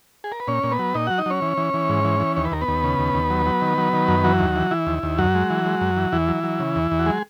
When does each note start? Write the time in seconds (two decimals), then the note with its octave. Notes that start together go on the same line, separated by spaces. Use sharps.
0.24 G#4
0.32 A#4
0.40 B4
0.47 A#2 C#4 C#5
0.63 A#2
0.71 B3 B4
0.79 F#3
0.94 A#2 D#4 D#5
1.07 F#3 F#4 F#5
1.18 D#4 D#5
1.26 F#3 C#4 C#5
1.42 E3
1.57 E3
1.74 E3
1.89 G#2
2.04 E3
2.20 E3
2.36 D#2 C#5
2.45 B4
2.52 D#2 A#4
2.61 B3 B4
2.68 D#2
2.84 C#3
2.99 D#2
3.14 D#2
3.30 F#3
3.46 F#3
3.62 D#3
3.78 F#3
3.93 D#3
4.08 F#2
4.24 E3 F#3 F#4
4.39 D#2
4.55 E3
4.71 E3 E4
4.87 D#2
5.03 D#2
5.18 F#2 F#3 F#4
5.35 G#3
5.50 E3
5.66 G#3
5.81 F#2
5.97 E3
6.12 E2 E3 E4
6.28 F#3
6.44 F#3
6.60 C#3
6.75 E2
6.91 E2
6.99 F#4
7.06 F#3 G#3 G#4